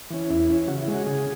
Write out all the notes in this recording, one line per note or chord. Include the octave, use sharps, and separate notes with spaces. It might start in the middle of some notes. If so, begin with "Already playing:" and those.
E3 C#4
E2 E4
E3 C#4
C#3 F#4
E4
G#3 C#4
F#4
C#3 G#4